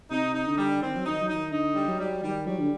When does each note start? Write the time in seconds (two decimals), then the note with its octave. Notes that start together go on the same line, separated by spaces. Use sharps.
0.11 C3 D#4
0.35 D#4
0.46 D3
0.58 G3
0.81 D#3 C4
0.95 F#3
1.05 D#3 D#4
1.21 F#3
1.28 D#4
1.33 D#3
1.52 D3 D#4
1.75 G3
1.88 F#3
1.99 G3
2.23 D#3 G3
2.46 F#3 G3
2.59 D3